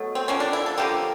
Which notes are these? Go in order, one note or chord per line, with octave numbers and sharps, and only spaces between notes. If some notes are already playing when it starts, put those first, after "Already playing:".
Already playing: B2 F#3 A3
C4
D3 F3 A#3 C#4
D4
E4
A4
D3 F3 A#3 G4